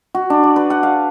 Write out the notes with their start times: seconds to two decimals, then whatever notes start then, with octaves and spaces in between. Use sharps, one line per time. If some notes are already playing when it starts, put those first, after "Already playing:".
0.15 F#4
0.30 D4
0.43 D5
0.56 B4
0.70 F#5
0.83 F5